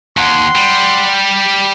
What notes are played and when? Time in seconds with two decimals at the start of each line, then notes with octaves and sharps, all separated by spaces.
0.17 D#2 F#5 C6
0.55 G3